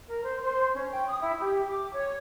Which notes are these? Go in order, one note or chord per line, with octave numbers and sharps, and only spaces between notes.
A#4
C5
C5
C#4
G5
D#6
E4
G4
D6
C#5